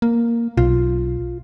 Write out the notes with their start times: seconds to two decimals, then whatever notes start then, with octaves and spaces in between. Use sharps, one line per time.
0.02 A#3
0.57 B1 F4